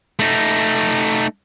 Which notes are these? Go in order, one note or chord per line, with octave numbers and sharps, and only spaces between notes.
A3 D#4